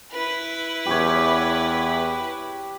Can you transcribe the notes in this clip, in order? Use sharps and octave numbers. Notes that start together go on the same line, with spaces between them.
E4 B4
E2 G4 C#5